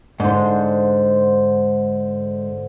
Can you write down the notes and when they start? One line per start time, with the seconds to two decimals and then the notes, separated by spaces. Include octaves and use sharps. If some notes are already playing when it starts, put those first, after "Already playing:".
0.20 G#2 D3 C5